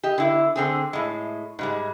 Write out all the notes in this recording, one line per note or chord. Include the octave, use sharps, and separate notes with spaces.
G4 D#5
D3 E4
D3 C4 G#4
A2 G#3
G#2 G3 G#3